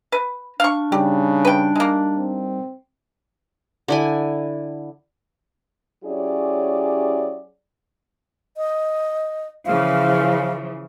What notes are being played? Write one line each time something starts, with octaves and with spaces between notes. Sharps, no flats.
B4
D4 F5 C#6
C#3 G3 D#4 G4
B4 G5
G#3 A#3
C4
D3 E4 G#5
F#3 C#4 E4 G4 G#4 D5
D#5
C#3 E3 F3 F5